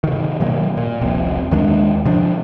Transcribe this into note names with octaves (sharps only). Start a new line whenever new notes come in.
C3 D#3
B2 D#3 F#3 A#3
A#2
D#1 A#1 C3
D#2 D#3 G#3 D4
C3 F3 D4